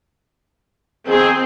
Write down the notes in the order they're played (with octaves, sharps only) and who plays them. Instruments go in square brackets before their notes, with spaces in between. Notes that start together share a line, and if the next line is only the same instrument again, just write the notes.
[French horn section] F2 D#3 G#4 [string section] C4